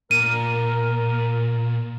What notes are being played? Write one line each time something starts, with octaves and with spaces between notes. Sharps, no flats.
A#2 A#4 D#7